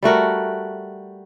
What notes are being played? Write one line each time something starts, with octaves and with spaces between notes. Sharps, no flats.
G3 A3 F#4 A#4